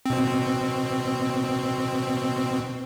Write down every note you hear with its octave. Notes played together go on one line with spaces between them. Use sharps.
B2 C4